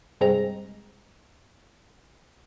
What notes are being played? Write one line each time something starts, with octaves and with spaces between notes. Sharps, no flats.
C2 G2 G#3 C4 A#5